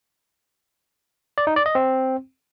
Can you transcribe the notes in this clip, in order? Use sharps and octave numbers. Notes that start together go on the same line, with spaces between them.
D5
D#4
D5
D#5
C4